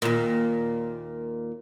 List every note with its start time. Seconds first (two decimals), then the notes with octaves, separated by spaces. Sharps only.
0.02 D#2 A#2